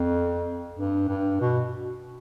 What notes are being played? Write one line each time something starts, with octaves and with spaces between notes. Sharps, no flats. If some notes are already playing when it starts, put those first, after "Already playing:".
Already playing: F2
G2
G2
B2